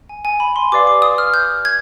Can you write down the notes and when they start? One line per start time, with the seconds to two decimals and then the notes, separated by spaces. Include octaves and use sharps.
0.09 G#5
0.25 G#5
0.40 B5
0.56 C6
0.72 G4 B4 D5 F5 D6
0.87 D6
1.02 D#6
1.18 F6
1.34 G6
1.65 G#6